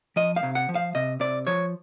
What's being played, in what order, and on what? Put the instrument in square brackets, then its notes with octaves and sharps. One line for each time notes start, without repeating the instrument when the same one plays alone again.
[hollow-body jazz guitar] F3 D#5
F5
C3
F#5
F3
F5
C3 D#5
C3 D5
F3 C#5